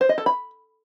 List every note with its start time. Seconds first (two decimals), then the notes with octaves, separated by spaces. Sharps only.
0.01 C5
0.09 D#5
0.18 A4
0.26 B5